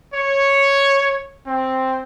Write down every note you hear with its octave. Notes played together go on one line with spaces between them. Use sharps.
C#5
C4